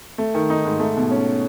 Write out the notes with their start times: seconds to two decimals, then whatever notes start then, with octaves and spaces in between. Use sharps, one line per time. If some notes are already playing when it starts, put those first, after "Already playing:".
0.18 A3
0.35 D#3
0.50 D#4
0.65 G#2
0.80 A3
0.96 B2
1.11 C#4